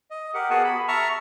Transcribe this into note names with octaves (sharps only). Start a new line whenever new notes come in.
D#5
G4 A#4 F#5
B3 F#4 G#4 F#5 G#5 A5
B5
E5 A5 A#5 C#6 F6